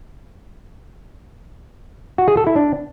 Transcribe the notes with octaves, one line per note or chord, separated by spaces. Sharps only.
F#4
G#4
A4
E4
D4